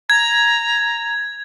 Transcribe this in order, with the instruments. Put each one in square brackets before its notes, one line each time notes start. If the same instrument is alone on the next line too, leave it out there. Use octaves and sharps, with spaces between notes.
[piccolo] A#5 [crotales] G#6